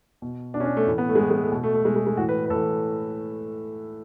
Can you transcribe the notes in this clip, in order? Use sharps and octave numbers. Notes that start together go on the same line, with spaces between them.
B2
B2 D4
C#4
D4
A3
A2 E3
B3
A3
G#3
A2 E3 A3
G#3
A3
B2
A3
A3
B2 G#3
G#3
G#3
A2 E3 F#4
B4
B4
A2 E3 A4